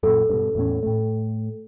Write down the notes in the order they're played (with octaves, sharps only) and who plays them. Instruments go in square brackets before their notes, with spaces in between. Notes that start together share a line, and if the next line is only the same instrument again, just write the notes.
[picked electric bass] F#2 A#2 [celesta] A4
[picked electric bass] G2 B2
E2 A2 C#4
A2 A3